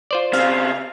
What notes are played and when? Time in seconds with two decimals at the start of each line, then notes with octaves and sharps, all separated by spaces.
0.11 F4 C5 D5
0.33 C#3 C4 F5